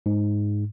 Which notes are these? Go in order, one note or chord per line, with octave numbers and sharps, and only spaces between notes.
G#2